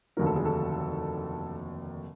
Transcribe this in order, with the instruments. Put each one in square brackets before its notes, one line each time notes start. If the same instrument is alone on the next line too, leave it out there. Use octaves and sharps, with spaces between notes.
[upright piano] F1 D#2 D3 F#3 A#4
A4
G#4
A4